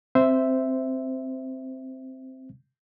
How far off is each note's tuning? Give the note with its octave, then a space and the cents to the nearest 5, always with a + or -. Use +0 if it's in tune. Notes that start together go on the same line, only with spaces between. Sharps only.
C4 +0 C5 -10 E5 +0